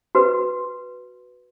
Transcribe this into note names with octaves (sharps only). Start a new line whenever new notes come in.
F#4 B4